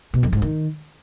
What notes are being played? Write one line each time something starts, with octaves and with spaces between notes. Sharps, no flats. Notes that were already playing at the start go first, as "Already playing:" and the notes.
B2
F2
G#2
D#3